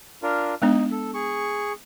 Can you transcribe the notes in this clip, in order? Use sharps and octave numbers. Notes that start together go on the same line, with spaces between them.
D4 F4 A#4
G#3 B3 D4 D#4
A4
G#4 C#6